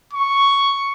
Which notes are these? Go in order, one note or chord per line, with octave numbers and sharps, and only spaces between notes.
C#6